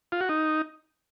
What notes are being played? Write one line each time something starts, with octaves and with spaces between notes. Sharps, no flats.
F4
F#4
D#4